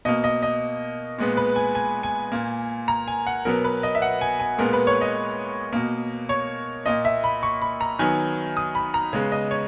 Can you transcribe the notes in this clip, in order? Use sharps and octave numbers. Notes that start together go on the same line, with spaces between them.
B2 A#3 D#5
D#5
D#5
A#2 G#3 B3
B4
G#5
G#5
G#5
A#2 A#3
A#5
G#5
F#5
B2 F#3 B3 A#4
B4
D#5
E5
F#5
G#5
G#5
A#2 G#3 B3 A#4
B4
C#5
D#5
B2 A#3
C#5
A#2 A#3 D#5
E5
B5
C#6
B5
A#5
D#3 F#3 B3 G#5
D#6
B5
A#5
C#3 G#3 B3
D#5
C#5